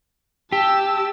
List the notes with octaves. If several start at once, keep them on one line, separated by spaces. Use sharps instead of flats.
G4 A5 E6